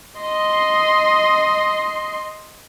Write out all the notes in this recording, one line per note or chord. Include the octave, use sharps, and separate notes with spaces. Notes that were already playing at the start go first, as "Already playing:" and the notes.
D#5 C6